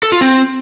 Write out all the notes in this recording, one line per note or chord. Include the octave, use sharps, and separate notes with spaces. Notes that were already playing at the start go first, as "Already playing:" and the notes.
A4
F4
C4